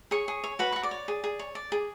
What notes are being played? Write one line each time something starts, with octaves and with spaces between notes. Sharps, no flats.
G#4 C#5 C#6
G#4
C#5
F#4 B4 B5
F#4 C#6
D5 D6
C#5
G#4
G#4
C#5
D5
G#4